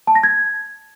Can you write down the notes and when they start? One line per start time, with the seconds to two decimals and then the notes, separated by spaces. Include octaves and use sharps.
0.07 A5
0.15 A#6
0.23 G#6